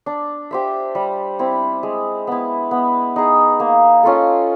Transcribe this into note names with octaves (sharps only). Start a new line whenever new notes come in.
D4
G4 C5 E5
G3
C4 E4
G#3
B3 E4
B3
D#4 G#4
A#3
C#4 F4 A4